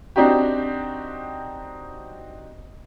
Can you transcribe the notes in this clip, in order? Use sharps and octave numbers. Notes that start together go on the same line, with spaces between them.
C4 D4 D#4 F#4 G4